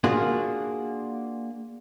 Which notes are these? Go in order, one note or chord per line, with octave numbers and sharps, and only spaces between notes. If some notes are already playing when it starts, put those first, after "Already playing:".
A#3 D4 F4 F#4 G#4